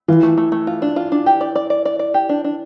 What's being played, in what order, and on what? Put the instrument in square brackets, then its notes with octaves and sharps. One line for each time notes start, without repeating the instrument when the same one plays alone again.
[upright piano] E3 [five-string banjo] F4
[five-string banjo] A3
A3
A3
F4
D4
F4
D4
G4
D5
D5
D5
D5
D5
G4
D4
D4